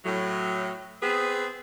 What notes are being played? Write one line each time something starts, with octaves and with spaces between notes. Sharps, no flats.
A2 F#3
B3 C4 G#4 B4